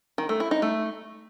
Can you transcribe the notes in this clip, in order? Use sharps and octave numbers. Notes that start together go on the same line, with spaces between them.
D#3
A3
E4
D#4
A3